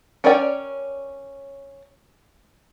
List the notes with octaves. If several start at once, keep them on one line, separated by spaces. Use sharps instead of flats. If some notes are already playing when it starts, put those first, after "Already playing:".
C#4 A#4 C#5 D5 G5